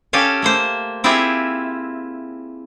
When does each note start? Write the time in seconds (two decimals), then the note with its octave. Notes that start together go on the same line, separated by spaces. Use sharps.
0.13 C#4 G4 A4 F5 G#5
0.42 A3 A#3 C5
1.04 C4 E4 F4 G4 G#4 E5